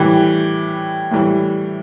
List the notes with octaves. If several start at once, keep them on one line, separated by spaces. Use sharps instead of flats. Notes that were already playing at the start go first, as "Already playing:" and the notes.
Already playing: A2 E3 G3 G4
A2 E3 G3